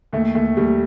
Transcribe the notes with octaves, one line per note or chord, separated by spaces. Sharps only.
D#2 A3
D#2 A3
D#2 G3